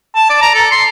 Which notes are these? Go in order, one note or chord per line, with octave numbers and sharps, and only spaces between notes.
A5
D5
A#5
A4
C6